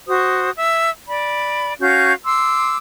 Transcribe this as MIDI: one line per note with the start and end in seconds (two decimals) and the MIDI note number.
0.08 0.50 66
0.08 0.50 72
0.08 0.50 87
0.56 0.90 76
0.56 0.90 88
1.07 1.73 74
1.07 1.73 83
1.80 2.13 61
1.80 2.13 66
1.80 2.13 77
1.80 2.13 91
2.26 2.76 84
2.26 2.76 86
2.26 2.76 88